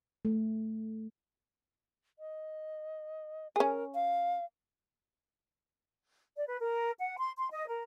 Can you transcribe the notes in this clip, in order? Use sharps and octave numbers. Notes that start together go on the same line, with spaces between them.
A3
D#5
C#4 G#4 A#4
F5
D5
B4
A#4
F#5
C6
C6
D#5
A#4